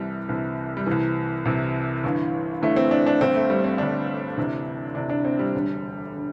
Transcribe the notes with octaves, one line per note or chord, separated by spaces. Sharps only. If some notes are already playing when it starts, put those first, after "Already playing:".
Already playing: C2 C3 E3 G3
C2 C3 E3
G3
C2 C3 E3
C2 C3 E3
G1 G2 E3
G1 G2 E3 A3
C4
D4
D4
G1 G2 D3 C4
A3
G3
C4
G1 G2 D3 D4
D2 C3 E3
D2 C3 E3 D4
D4
C4
G3
E1 D2 D3
D3